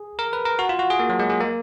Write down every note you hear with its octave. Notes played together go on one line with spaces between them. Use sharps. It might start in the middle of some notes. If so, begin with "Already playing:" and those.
Already playing: G#4
A#4
B4
A#4
F#4
F4
F#4
G#4
A#3
F#3
G#3
G#3
A#3